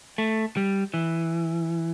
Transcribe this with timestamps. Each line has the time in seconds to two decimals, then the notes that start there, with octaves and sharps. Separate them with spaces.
0.18 A3
0.57 G3
0.94 E3